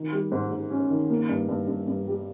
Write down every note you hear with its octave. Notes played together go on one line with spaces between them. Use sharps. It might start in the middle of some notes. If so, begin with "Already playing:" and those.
Already playing: D#3
G3
G#2
G#2
C#4
D#3
A#3
G2
G2
G2
G2
G3